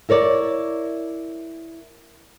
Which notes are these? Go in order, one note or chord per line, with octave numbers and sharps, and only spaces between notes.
E4 A#4 C#5 D5